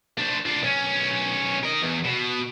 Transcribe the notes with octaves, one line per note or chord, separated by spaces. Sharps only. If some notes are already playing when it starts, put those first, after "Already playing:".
D4 C5
D4 F4
B1 C#4
A#4 D#5
E2
B2